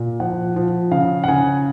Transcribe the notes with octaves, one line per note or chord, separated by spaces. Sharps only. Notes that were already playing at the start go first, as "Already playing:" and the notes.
Already playing: A#2
F3 F#5
F3
C#3 F5
F#5
C#3 G#5